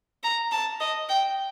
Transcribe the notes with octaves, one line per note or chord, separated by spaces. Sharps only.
A#5
A5
D#5
G5